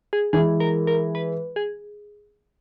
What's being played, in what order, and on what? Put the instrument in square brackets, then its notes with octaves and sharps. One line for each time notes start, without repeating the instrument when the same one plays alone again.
[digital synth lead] G#4
[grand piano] E3 G#3 [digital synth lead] G#4
[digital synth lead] A#4
A#4
B4
G#4